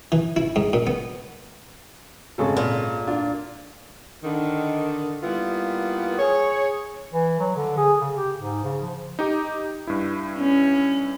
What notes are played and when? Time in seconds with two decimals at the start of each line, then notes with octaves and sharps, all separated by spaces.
0.12 E3
0.36 E4
0.56 G#2
0.73 A#2
0.87 B3
2.38 G#1 C#3 A4
2.57 A#2
3.07 D4 F4
4.24 D3 D#3
5.23 G3 A#3 B3 E4 F4
6.19 G#4 C#5
7.13 E3
7.40 F#3
7.56 D3
7.77 G#4
8.01 C#3
8.16 G4
8.38 G#2
8.64 C#3
8.82 F3
9.19 D#4 G4
9.87 G2 E4
10.38 C#4